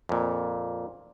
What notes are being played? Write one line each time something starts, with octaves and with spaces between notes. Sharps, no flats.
F2 A#2